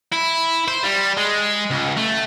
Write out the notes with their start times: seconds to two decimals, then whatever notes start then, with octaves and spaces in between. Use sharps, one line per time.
0.13 E4
0.68 C5
0.83 G3
1.17 G#3
1.70 C#2
1.97 A3